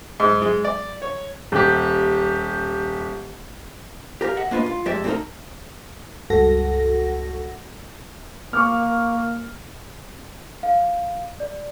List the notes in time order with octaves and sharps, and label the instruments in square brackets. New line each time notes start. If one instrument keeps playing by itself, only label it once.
[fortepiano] G#2
G#3
D5
C#5
[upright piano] D#1 G4
[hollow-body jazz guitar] G4 A#4 F5
D#5 E5 F#5
A#3 D4 F4 B4 D#5
F4
F2 G#3 G4 D5 E5
C4 D4 D#4 F4 A4 A#4
[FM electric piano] C#2 G2 F#4 A4 F#5 A#6
[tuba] A#3 [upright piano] C#6 D6 F6
[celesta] F5
D5